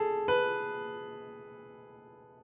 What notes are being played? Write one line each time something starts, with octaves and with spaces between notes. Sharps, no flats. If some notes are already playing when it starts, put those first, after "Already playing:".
Already playing: G#4 A4
B4